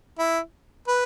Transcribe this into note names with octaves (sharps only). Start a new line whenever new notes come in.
E4
B4